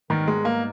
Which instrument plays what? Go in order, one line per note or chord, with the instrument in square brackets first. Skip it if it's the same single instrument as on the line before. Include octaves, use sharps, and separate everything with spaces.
[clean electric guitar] G#2 G3 B3 D#4 A#4 [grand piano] D#3
[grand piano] G#3
A#3